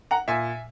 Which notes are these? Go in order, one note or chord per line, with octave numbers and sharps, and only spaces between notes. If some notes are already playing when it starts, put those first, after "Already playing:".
F#5 A#5
A#2 E5 G#5